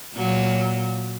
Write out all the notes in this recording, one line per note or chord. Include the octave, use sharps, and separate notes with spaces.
A#2 F#3